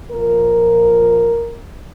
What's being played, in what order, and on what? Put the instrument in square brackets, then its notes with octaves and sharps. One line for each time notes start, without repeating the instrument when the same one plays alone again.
[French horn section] A#2 F3 A#4